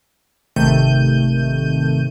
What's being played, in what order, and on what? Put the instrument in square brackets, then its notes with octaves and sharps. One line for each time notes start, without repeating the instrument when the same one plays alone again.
[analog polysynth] G#1 C3 D#3 A3 G6 D#7